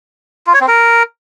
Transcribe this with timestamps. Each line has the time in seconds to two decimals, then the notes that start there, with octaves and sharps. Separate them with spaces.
0.47 F4
0.54 C#5
0.61 C4
0.68 A#4